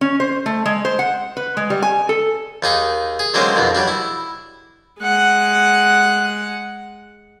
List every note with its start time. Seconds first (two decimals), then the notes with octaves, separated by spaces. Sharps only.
0.01 C#4
0.20 C5
0.46 A3
0.66 G#3
0.85 C5
0.99 F#5
1.37 B4
1.57 G#3
1.70 G3
1.82 G#5
2.09 A4
2.63 D#2 D#4 G#4
3.19 G#4
3.34 D3 F#3 G#3 A#3 C4 C#4
3.56 F2 G#2 B2
3.75 F#3 G3 D4
3.88 E4
5.00 G#3 F#5